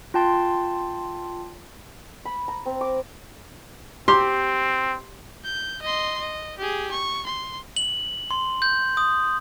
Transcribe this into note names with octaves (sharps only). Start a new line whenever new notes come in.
F4 G5 A5 C6
B5
A#5
C4
D6
C4 G4 C6
G6
D#5 C6
D#5
G4 G#4
C#6
C6
F#7
C6
G6
D#6